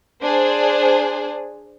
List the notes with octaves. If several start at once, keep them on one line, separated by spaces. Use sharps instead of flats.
D4 G#4 C5